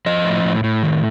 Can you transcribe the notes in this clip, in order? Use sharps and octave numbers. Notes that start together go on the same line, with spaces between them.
F3 D#5
A2
A2
A2
D#3